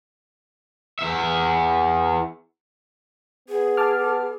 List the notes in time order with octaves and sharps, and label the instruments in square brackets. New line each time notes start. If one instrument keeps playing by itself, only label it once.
[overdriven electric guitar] E2 E5
[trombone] B3 [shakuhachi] G#4
[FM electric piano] A5 D6 F6